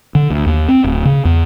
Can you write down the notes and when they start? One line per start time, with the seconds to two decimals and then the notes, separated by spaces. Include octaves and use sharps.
0.15 D3
0.30 D2
0.46 D#2
0.68 C4
0.84 D1
1.05 C#3
1.25 E2